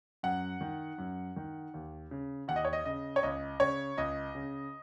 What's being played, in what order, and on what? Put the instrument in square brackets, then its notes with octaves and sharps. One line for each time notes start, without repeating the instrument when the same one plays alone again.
[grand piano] F#2 F#5
D#3
F#2
D#3
D#2
C#3
D#2 F#5
D#5
C#5
D#5
C#3 D#5
C#5
C#2 D#5
C#3 C#5
C#2 D#5
C#3